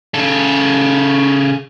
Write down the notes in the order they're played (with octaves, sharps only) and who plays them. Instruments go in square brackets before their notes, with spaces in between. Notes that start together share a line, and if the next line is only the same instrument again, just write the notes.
[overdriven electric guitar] C#3 A4